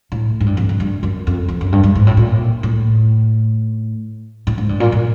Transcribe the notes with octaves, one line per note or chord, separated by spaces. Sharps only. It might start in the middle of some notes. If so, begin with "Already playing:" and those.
A2
G#2
G2
F2
G2
G2
F#2
F2
F2
F#2
G2
G2
G#2
A2
A#2
A2
A2
G#2
G2
A#2
A#2